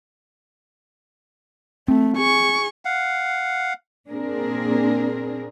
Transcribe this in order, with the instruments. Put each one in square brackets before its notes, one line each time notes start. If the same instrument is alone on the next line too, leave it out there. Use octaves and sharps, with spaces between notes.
[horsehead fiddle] A3 [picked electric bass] C4
[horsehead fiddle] G#4 [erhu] C#6
[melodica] F5 F#5
[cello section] A#2 A#3 C4 D4 G#4 A#4